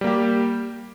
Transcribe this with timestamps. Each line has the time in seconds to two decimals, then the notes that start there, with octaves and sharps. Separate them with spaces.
0.01 G3
0.04 A#3
0.07 G4